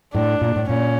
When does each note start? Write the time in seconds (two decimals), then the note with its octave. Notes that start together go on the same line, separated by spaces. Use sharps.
0.14 A2 D4
0.42 A#2
0.56 A2
0.69 A#2 C#4